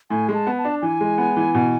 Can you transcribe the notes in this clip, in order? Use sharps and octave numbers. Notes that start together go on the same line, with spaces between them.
A2 G#5
G#3
A5
B3
A5
D4
E3 G#5
G#3
B3
E3
B2